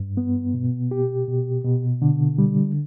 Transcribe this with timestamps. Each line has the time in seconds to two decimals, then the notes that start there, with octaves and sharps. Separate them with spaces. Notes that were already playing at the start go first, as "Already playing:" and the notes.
Already playing: G2
0.17 B3
0.54 B2
0.91 G4
1.28 B2
1.64 B2
2.02 D3
2.38 G3